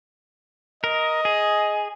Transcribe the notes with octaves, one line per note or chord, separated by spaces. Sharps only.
A#4 D#5
G#4